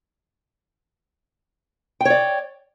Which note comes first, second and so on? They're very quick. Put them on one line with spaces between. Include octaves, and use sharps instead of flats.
G5 C#5 D5